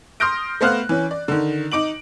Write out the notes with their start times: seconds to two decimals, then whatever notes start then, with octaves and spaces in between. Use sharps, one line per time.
0.20 C6 D#6 F6 G6 A#6 D7
0.61 A3 B3 C5 F5 F6 F#6
0.89 E3 C#4
1.11 D5
1.28 D3 D#3
1.72 D#4 D6 D7 F#7